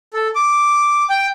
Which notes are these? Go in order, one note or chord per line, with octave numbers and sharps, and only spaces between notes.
A4
D6
G5